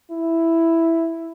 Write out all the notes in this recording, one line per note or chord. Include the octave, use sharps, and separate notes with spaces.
E4